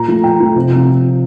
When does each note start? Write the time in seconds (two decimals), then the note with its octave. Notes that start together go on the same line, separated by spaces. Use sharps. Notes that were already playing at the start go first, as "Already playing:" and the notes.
Already playing: A#2 A#5
0.08 F3 A3
0.24 A#2 G5
0.40 F3 A3
0.56 C3
0.72 F3 C4